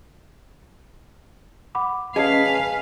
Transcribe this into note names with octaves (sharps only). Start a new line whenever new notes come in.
F#5 B5 D6
C#4 G#4 B4 C#5 D#5 F5 A5 C7
G#5